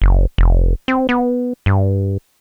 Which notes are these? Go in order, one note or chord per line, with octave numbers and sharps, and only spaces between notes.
F#1
F1
C4
B3
G2